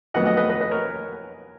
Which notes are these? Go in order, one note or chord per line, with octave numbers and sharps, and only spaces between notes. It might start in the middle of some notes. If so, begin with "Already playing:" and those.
F2 D#3 F#3 B3 D#4 D#5 F#5
D#5 F#5
B4 D#5
B4 D#5
B4 D#5
A#4 C#5